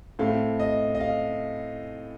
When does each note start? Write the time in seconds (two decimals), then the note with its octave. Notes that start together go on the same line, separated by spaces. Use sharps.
0.19 A2 A3 C4 F5
0.60 D#5
0.95 D#5
1.01 F5